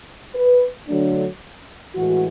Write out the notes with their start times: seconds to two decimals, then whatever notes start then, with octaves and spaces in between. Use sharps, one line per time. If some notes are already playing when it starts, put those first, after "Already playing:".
0.35 B4
0.88 D3 F#3 A3 D4
1.95 A2 E3 G#3 F#4